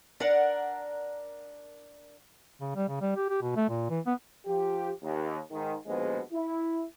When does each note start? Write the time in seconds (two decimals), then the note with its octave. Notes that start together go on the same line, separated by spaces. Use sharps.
0.20 D4 A#4 F#5
2.61 C#3
2.76 G3
2.88 C#3
3.01 G3
3.16 G4
3.29 G4
3.42 B2
3.56 A3
3.69 A#2
3.90 E3
4.06 B3
4.46 F3 G4
5.03 D#2
5.51 G#2 D#3
5.87 A#1 D#2 B2 G#3 B3 C5
6.32 E4